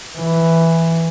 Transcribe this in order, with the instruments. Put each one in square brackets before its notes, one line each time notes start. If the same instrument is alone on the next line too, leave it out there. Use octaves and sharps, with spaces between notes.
[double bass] E3